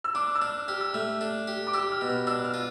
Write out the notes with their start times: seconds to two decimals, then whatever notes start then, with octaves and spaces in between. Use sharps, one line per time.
0.04 E6
0.15 D4 D6
0.35 E6
0.42 D4 F6
0.68 G4 F6
0.81 E6
0.94 A3 F6
1.21 D4
1.48 G4
1.67 D6
1.74 G4 E6
1.92 F6
2.01 B2
2.09 F6
2.27 D4 E6
2.44 F6
2.54 F4